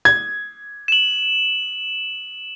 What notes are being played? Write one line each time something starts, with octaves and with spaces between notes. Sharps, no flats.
G#6
E7 F#7